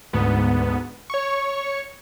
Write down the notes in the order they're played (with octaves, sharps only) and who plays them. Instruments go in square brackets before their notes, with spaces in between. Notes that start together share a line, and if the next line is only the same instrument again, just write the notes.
[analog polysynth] D2 G#2 B3
C#5 C#6